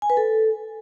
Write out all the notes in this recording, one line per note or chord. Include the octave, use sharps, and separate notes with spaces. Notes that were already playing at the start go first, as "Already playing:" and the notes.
G#5
B4
A4